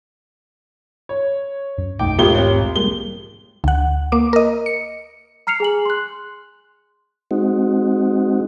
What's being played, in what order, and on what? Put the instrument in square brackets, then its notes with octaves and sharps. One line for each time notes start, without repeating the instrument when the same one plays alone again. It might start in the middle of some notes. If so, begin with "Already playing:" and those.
[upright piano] C#5
[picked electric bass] F#2
[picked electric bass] E1 B1 A3 [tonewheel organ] D#4 D6 [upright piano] G5
[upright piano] G#1 G5 G7 [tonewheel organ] G#2 [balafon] F4 G4
[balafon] C4 C#5
[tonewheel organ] G3 G#3 A#3 [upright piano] G7
[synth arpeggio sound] D2 F#5
A#3 D6
A#4 D#5
C#7
[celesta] A#5 F6 C7 C#7 F7
G#4 G#5 F#7
C6 F#6
[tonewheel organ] G#3 C4 D#4 F#4